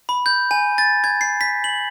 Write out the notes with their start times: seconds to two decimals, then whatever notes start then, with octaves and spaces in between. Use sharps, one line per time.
0.09 B5
0.26 G6
0.51 G#5
0.78 A6
1.04 G#6
1.21 C7
1.41 B6
1.64 F#7